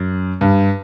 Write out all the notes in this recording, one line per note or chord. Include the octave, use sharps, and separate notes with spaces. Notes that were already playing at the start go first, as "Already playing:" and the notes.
Already playing: F#2
G2